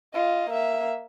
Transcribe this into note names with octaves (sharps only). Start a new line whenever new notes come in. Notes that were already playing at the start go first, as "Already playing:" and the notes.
F4 D#5
A#3 E5